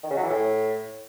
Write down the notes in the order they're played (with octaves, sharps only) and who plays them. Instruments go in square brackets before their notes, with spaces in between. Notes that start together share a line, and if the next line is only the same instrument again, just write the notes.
[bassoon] D#3
C#3
F#3
E3
A2